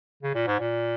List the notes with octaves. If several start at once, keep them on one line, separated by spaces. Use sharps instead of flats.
C#3
A#2
G#2
A#2